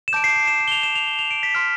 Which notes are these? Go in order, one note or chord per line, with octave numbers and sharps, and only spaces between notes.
E7
A5 D6 G6 D7
C7
C7
E7
E7
G7
F7
E7
F7
G7
F7
D7
B6
C6 F6